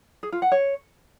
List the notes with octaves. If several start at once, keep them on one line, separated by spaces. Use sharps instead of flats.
G#4
F4
F#5
C#5